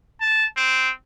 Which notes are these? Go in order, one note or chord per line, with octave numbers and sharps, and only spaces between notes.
A5
C4